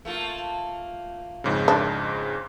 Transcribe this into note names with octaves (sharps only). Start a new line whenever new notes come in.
A3 A#3 F4
F2 G#2 C#3
D4